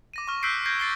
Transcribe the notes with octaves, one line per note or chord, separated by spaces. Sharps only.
D6 A#6 D#7
C#6 F6
E6 F#6 G6 B6 C7 D7
G6 G#6 A#6 C7
A6 C7 D7 G7